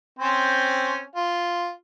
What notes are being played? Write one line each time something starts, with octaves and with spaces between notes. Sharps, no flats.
C4 C#4 C5
F4